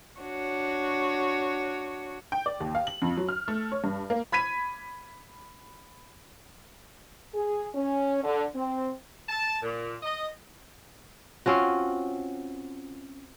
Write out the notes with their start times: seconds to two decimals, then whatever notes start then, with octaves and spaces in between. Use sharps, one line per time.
0.19 D4 F#4 C#5
2.32 G5
2.46 D5
2.60 D#2
2.75 F5
2.87 F#7
3.02 F2
3.17 F#3
3.29 F6
3.48 A3
3.72 C#5
3.84 G2
4.10 A#3
4.32 B5 G#6 B6 D#7
7.34 G#4
7.75 C#4
8.23 D3
8.55 C4
9.29 A5
9.63 A#2
10.03 D#5
11.46 C4 C#4 F4 F#4